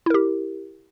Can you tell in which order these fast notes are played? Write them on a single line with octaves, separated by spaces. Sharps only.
E4 A#4 G4